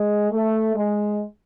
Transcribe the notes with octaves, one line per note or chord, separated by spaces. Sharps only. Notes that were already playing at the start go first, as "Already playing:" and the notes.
Already playing: G#3
A3
G#3